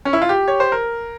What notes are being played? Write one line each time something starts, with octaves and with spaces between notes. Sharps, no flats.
C#4
E4
F4
G4
C#5
C5
A#4